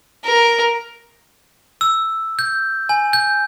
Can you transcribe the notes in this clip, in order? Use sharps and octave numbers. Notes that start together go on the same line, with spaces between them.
A#4
E6
G6
G#5
G6